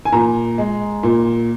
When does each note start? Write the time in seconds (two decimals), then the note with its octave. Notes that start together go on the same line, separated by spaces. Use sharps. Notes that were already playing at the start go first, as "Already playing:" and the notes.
0.05 G#5
0.13 A#2 A#5
0.58 G#3
1.03 A#2